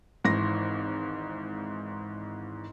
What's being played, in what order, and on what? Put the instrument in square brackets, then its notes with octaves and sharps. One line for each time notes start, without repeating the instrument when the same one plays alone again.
[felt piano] G#1 G#2 E3 A#6